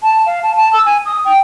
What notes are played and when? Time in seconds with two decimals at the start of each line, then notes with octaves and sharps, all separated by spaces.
0.03 A5
0.26 F5
0.43 A5
0.57 A5
0.73 E6
0.86 G#5
1.06 D#6
1.25 G5